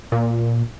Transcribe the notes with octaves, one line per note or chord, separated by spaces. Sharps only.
A#2